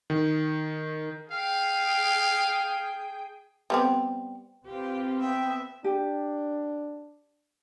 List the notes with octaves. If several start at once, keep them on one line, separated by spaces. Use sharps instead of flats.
D#3
G#4 F5 G5
G3 B3 C4
C4 F4 G4 B4 F5
B3 E5 G5
D4 G4